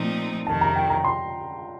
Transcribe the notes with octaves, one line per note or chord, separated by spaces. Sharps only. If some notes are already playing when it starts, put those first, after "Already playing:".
Already playing: A#2 F3 A3 C4 D#4
F2 C3 D#3 A5
A#5
G5
A#5
C6